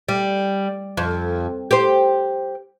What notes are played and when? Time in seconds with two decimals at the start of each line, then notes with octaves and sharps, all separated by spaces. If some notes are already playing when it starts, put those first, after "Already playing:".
0.09 G3
0.97 F2
1.71 G4 C5